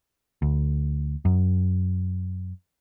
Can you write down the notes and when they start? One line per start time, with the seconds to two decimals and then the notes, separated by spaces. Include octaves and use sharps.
0.42 D2
1.25 F#2